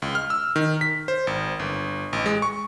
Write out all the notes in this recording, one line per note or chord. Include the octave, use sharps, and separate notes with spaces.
C#2
F6
E6
D#3
B6
C5
G#1
G1
A1
G#3
C#6